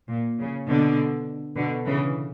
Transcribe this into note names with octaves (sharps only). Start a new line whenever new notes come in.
A#2
C#3
B2 D3
B2 D3
C#3 E3